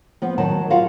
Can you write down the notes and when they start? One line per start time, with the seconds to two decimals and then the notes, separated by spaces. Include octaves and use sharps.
0.22 F3 B3
0.38 D#3 F#3 A5
0.70 F4 F#4 F5 F#5